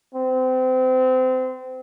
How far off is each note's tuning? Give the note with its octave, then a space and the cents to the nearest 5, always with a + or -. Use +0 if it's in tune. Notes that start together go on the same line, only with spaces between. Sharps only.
C4 -30